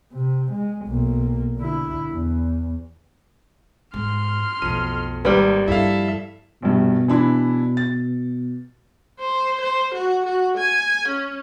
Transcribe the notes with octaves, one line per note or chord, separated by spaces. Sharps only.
C3
G#3
B1 A#3
D3 E4
E2
G#2 C6 F6
B1 F2 A3 D#7
G#1 G3 A#3 B4
G2 F3 E4 A4 E5 F5
A#1 G2 B2
E3 D4 E4
A6
C5
C5
F#4
F#4
G#5
C#4